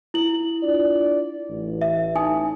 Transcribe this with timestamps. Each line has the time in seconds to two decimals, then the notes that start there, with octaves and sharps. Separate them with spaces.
0.14 E4 F#7
0.63 D4 F4 D5
1.50 A1
1.82 E5
2.15 D#4 G#5 D#6